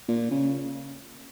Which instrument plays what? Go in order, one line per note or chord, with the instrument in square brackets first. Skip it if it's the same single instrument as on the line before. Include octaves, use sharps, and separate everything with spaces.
[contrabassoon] A#2
C#3